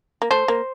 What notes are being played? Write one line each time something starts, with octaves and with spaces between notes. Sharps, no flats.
A#3
A3 C5
A#3